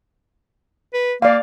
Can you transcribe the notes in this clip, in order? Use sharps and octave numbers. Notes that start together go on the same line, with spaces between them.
B4
A#3 D5 F5